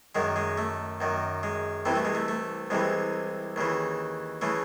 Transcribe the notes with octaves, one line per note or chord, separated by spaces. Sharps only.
F#2 D#3 G#3
G#3
A3
F#2 D#3
G#3
C2 C3 E3 C4
A3
G#3
A3
A3
C2 C3 E3 G#3
D#2 C#3 E3
C#3 E3 A3